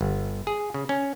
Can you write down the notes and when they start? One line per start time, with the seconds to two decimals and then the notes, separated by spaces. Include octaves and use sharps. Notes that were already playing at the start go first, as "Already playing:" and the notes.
0.01 G1
0.47 G#4
0.74 C#3
0.89 C#4